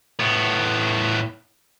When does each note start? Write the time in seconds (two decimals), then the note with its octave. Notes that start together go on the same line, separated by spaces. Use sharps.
0.20 A2 B3